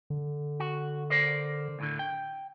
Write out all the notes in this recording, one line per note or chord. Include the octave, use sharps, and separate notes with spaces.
D3
F#4
A#4 C5 D5
D2 A2 D3
G5